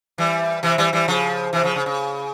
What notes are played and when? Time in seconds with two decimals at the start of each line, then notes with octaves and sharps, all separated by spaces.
0.18 E3 G3
0.63 C3 E3
0.78 E3 G3
0.93 E3 G3
1.08 C#3 F3
1.53 C3 E3
1.63 C#3 F3
1.76 C#3
1.86 C#3